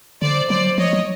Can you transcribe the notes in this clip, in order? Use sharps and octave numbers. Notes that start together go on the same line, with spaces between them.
D3 C5 D5
F#3 C5 D5
F3 C#5 D#5
F#3